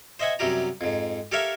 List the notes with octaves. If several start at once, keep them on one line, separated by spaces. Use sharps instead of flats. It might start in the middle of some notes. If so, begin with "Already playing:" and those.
C5 D#5 E5 F#5 G#5
F#2 C3 F#3 G3 G4 A#5
F2 G#2
G4 A4 A#4 C#5 E5 F5